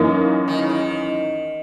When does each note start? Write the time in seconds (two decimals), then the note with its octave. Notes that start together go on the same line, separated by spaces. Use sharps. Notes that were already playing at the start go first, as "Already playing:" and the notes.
Already playing: F#2 E3 A#3 D#4
0.48 D#3
0.59 C#3
0.70 D#3